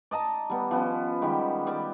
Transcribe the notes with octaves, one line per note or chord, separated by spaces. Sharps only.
D5 D#5 A5 A#5
G3 B3
F3 B3 C#4
D#3 G3 G#3 G4
G3 D5